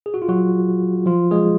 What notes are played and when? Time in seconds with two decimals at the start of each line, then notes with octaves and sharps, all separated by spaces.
0.06 G#4
0.14 F#4
0.22 F4
0.29 F#3 F#4
1.06 F3 F4
1.31 G#3 G#4